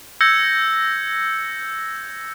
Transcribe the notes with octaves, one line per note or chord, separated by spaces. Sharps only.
E6 G6 G#6 A#6 C#7